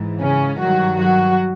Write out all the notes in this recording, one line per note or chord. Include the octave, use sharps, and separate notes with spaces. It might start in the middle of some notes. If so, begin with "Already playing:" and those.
Already playing: G#2 E3
C#3 C#4
G2 D#3 F#3 F#4
F#3 F#4